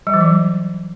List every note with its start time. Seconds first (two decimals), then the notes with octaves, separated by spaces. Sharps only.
0.07 G3
0.14 E3
0.20 F#3